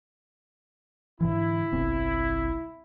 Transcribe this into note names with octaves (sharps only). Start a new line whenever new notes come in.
G#2 D3 E3 E4
G1 C2 C4